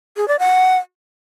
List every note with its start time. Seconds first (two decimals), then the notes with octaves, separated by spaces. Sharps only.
0.17 G#4
0.28 D5
0.39 F#5